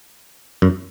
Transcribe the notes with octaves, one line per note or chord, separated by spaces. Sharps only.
F#2